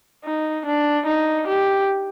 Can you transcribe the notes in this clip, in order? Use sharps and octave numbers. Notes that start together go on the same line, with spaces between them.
D#4
D4
D#4
G4